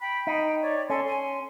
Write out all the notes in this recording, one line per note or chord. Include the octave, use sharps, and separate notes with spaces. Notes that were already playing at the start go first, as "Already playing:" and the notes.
G5 B5
D#4 B5
C#5 D5
C#4 A4 C6
G#5